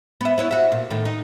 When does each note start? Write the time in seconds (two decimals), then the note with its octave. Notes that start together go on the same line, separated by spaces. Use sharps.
0.21 B3 E5
0.38 B3 E4 C#5
0.51 F#4 E5
0.72 A#2
0.91 A2 D#3
1.05 D#4